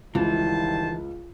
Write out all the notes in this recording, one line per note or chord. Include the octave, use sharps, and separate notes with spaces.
C#2 D#3 E3 G3 E4 C5 A5